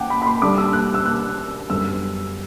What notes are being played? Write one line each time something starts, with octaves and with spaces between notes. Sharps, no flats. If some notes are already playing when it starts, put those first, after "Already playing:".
Already playing: F#5 G5 D6
B5
B5
C6
D3 G3 D4 D6
E6
F#6
E6
F#6
F#2 D3 G3 B3 E6